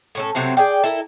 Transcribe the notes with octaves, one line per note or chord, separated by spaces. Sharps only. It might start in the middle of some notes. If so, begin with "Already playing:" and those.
A2 C#4 A4
C3 F#3 A3 C4
G#4 D5 G5
E4 A4 A#4